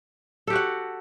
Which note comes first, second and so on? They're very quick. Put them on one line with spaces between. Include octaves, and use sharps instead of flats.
A4 G4 F#4 F#5